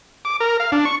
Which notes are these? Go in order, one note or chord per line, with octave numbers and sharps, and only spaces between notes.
D6
A#4
F5
D4
C#6